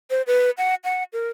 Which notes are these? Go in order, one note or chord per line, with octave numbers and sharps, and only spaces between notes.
C5
B4
F#5
F#5
A#4